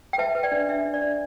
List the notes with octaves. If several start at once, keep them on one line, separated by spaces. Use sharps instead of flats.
G5
B4 E5 A5
B4
D5 G5
D4
D4 E5
D4
D5
D4